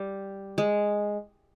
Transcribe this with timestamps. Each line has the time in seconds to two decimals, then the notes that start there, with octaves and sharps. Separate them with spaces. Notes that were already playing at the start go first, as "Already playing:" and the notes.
Already playing: G3
0.58 G#3